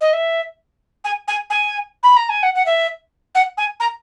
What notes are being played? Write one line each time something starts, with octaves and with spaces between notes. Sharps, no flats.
D#5
E5
G#5
G#5
G#5
B5
A#5
G#5
F#5
F#5
E5
F#5
G#5
A#5